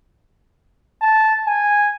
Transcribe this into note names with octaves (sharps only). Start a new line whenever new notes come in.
A5
G#5